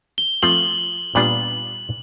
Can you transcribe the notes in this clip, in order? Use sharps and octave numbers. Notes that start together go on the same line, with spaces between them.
G7
F3 A3 C4 F4 F#7
A#2 G3 B3 D4 F4 F#7